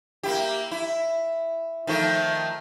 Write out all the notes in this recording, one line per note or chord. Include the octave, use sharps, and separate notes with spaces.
A#3 E4 G4
E4
D#3 F3 A3